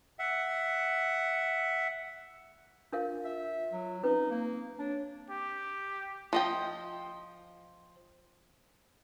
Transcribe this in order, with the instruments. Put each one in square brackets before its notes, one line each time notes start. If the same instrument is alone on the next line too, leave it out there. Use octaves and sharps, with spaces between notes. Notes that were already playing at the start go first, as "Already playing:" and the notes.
[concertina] E5 F#5
[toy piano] D4 A#4 F5 [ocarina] F4
[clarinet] E5
F#3
[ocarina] C4 [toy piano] C#4 B4 [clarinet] D#4
[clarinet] A#3
[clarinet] D4 [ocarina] C#5
[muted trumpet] G4
[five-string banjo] F3 D#5 G5